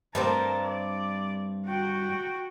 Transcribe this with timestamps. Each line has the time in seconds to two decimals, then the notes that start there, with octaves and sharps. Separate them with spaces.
0.15 G2 G3 C4 A#4 A5
0.64 D5
1.66 F#4 G5